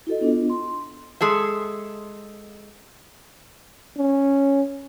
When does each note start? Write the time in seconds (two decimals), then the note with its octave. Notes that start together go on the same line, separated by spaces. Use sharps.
0.07 E4 F#4 A4 D#5
0.21 B3 D4 F4
0.50 C6
1.21 G#3 G#4 A4 E5
3.97 C#4